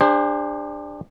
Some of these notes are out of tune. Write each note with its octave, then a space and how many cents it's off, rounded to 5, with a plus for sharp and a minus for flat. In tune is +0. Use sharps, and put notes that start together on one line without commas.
D4 +10 G4 +45 C5 +0